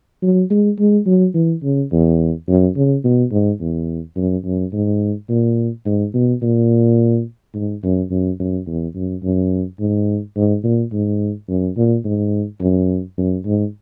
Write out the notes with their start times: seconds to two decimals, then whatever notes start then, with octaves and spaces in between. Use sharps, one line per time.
0.23 F#3
0.50 G#3
0.79 G#3
1.06 F#3
1.34 E3
1.63 C#3
1.92 E2
2.48 F#2
2.76 C#3
3.04 B2
3.32 G#2
3.61 E2
4.17 F#2
4.45 F#2
4.73 G#2
5.29 A#2
5.86 G#2
6.14 B2
6.42 A#2
7.54 G#2
7.83 F#2
8.11 F#2
8.40 F#2
8.67 E2
8.95 F#2
9.23 F#2
9.80 G#2
10.36 G#2
10.64 A#2
10.92 G#2
11.49 F#2
11.77 A#2
12.05 G#2
12.61 F#2
13.18 F#2
13.45 G#2